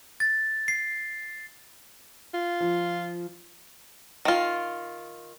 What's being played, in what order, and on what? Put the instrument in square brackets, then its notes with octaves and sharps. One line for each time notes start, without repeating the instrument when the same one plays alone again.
[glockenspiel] A6
C7
[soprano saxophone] F4
[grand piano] F3
[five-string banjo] D#3 F4